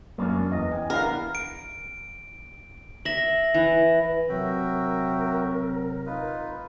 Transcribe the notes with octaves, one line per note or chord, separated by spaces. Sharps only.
F#2 A#3 C#4 D4
E2 D#5
G5 G#5
B3 D4 E4 A#4 F5
D7
E5 A#6 F#7
E3
C3 F#3 F#4 A#4 E5 G5
D#4 F4 B4